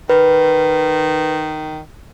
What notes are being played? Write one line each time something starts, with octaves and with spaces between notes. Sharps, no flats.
D#3 B4